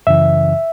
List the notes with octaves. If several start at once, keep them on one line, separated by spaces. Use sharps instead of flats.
F#2 C#3 E3 E5